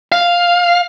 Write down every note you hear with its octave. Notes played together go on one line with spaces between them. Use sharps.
F5